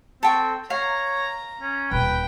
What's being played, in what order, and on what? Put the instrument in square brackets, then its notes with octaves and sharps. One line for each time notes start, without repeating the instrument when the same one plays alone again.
[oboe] C4 [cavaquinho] A4 G5 C#6
[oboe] C#5 [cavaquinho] F5 [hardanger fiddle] A#5
[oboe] C#4
[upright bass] D#1 D2 [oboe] B4 [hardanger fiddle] G5